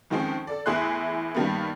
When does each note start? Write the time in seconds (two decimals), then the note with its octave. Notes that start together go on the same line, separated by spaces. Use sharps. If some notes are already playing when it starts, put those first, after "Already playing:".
0.10 F2 D#3 F3 G#3 C4 C#4
0.47 A4 D5
0.66 E2 A2 E4 G#4 C6 F#6
1.35 G2 D#3 G3 A#3 B3